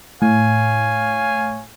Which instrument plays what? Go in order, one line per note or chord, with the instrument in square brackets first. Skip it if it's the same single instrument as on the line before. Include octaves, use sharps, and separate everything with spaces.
[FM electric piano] A2 [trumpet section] C#5 F5 G#5